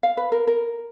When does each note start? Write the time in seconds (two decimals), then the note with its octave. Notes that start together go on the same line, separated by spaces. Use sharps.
0.03 F5
0.17 B4
0.32 A#4
0.47 A#4